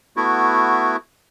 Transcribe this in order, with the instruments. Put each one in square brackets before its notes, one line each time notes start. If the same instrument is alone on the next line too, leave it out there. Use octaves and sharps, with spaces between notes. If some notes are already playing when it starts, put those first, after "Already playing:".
[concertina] A3 B3 E4 F#4